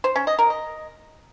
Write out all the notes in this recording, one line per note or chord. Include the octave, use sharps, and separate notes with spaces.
C5
C#4
D#5
A#4
D#5